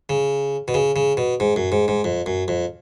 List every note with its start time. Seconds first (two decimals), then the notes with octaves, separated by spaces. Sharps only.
0.09 C#3
0.68 B2
0.74 C#3
0.96 C#3
1.17 B2
1.40 G#2
1.56 F#2
1.72 G#2
1.88 G#2
2.04 F2
2.26 F#2
2.48 F2